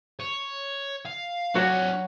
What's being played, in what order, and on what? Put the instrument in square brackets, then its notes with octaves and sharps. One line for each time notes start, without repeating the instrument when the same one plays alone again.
[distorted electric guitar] C#5
F5
[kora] F#3 F#4 [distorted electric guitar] D4 C#5